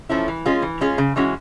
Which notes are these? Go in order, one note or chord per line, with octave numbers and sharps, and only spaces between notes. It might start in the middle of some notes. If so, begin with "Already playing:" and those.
F3 A3 C#4 E4
E3
G#3 C#4 F4 G#4
E3
G#3 C#4 F4 G#4
C#3
E3 G#3 C#4 F#4